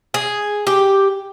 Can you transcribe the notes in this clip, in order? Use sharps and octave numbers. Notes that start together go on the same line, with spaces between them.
G#4
G4